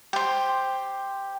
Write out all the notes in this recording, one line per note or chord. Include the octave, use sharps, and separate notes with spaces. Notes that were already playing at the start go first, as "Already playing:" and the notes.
G4 C5